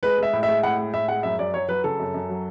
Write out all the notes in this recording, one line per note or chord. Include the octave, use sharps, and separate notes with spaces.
G#3 B4
G#3 E5
A2
E5
G#3
A2 F#5
G#3
A2 E5
G#3 F#5
F#2 E5
F#2 D5
F#3 C#5
F#3 B4
C#3 A4
F#2
F#2
F#3